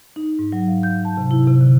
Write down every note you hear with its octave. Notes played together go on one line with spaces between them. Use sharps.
D#4
G#2
F#3
F5
G6
A5
C3
E4
C3
D3